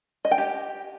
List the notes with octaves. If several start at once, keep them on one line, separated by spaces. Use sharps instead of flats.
D#5
G5
G4